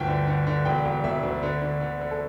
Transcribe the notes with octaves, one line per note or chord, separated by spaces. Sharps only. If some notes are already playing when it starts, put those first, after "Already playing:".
Already playing: G1 D2 G5
D3
D3
D3
E1 G5
E1
E1 E5
D2
D3
D3
D3
D3
A4